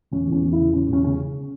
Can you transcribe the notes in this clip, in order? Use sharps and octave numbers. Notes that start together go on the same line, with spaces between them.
E1 C#4
E2
C#4
E2
C#3 E4
E1 C#4
E1 C#4
C#3 C#4